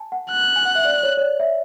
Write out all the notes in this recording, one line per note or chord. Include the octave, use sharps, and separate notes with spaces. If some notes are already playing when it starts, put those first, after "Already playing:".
Already playing: G#5 A5
F#5
F#6
G#5
F#5
E5
D5
C#5
C#5
D5
E5